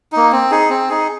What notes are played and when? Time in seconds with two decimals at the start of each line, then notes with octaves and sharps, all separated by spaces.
0.12 A#3 D#4
0.32 C4
0.51 D#4 G#4
0.70 C4
0.89 D#4 G#4